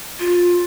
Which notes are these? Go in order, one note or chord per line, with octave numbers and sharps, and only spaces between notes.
F4